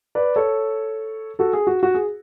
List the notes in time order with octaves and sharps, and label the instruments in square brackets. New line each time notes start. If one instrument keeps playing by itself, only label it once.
[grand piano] B4 D5
A4 C#5
F#4 A4
G#4
F#4
F#4
G#4